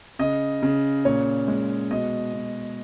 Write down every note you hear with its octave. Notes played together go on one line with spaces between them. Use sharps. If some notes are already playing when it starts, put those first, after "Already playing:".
C#3 D#5
C#3
A#2 C#5
G#3
B2 D#5
B2